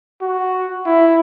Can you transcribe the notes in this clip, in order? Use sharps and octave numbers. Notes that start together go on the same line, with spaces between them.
F#4
E4